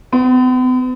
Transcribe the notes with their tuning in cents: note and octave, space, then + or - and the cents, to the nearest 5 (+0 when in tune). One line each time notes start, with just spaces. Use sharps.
B3 +45